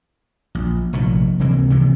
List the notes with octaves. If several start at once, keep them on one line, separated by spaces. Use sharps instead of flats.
A#1
F1 A#1 A#2 D#3
C#2 C3 E3 A#3
C3 D#3 E3 G#3